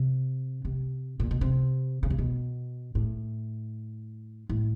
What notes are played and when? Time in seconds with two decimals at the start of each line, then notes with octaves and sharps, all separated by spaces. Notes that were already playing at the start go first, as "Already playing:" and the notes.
Already playing: C3
0.65 C3
1.20 A#2
1.31 B2
1.41 C3
2.03 C#3
2.10 C3
2.18 B2
2.95 A2
4.49 A2